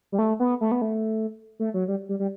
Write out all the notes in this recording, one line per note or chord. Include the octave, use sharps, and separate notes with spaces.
G3
A3
B3
A3
B3
A3
A3
F#3
G3
G3
G3